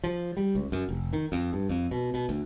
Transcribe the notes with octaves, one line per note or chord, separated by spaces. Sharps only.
F3
G3
C#2
F#2
F1
D#3
F2
G2
F2
B2
B2
D2